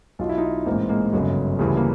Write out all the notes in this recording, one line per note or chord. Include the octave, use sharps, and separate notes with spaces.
B1 B2 F4
E4
D#4 F4
A1 G#2 E3 A#3 C4
G#3 A#3
G1 F#2 C#3 F#3 G#3
D2 C#3 E3 G3 A3
A#3